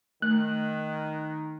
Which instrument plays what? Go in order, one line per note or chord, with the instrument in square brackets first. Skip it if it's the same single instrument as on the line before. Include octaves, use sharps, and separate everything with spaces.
[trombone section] D#3 [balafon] A3 [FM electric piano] F#6